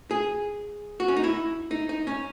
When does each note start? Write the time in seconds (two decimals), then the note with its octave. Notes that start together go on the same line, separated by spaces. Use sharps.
0.11 G#4
1.00 F#4
1.08 C#4
1.17 D#4
1.24 E4
1.71 D#4
1.89 D#4
2.07 C#4